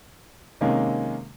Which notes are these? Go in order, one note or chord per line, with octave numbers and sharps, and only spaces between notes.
C3 D#3 G#3 A#3 C#4